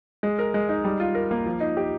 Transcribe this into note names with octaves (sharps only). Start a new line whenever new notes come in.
G#3
A#4
G#3
D#4
G3
F4
A#4
A#3
F3
D#4
G4